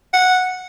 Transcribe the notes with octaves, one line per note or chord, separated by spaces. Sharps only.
F#5